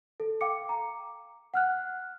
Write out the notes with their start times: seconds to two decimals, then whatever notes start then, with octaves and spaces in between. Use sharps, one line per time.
0.20 A4
0.41 F5 G5 D6 C#7
0.69 A#5
1.54 F#5 F6 F#6